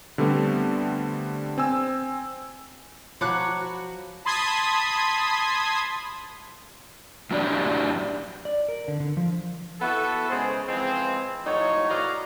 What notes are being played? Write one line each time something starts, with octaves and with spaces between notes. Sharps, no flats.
D3 G3 A3 B3 C4
C4 G#5 E6
F3 F#3 C#5 B5 D6 F#6
F#4
A5 B5 C6 D#6 G#6 B6
F#2 A2 D4 F#4 G4 D5
D5
A#4
D3
D3
F3
B3 E4 F#4 A4
C#3 G#3 G#4 C5
E3 F3 G#3 C4
A2 F3 F#3 D#4 C#5
E3 F#4 D5 D#5 F5 A#5